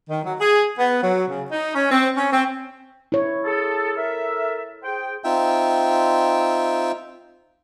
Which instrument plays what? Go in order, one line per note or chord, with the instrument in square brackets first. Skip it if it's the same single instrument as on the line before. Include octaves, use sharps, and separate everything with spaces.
[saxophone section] D#3
F#3
G#4
B3
F#3
C#3
D#4
C#4
C4
C#4
C4
[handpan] E4 C#5
[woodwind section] G#4 A4
A4 A#4 E5
G#4 C5 G5
[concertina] C4 D#4 F4 E5 G5